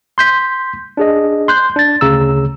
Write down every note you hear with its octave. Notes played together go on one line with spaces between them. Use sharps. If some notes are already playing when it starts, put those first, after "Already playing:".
C6 G6 B6
D4 G#4 D#5
C6 F#6 G6
D4 A6
D2 C#3 A#5 E6